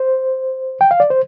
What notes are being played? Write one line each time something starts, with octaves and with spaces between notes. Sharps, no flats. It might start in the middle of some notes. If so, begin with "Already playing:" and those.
Already playing: C5
G5
F5
D5
C5